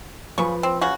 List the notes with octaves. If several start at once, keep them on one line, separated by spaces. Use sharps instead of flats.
C#3 F3 B4 B5 C#6
C4
C#3 F#4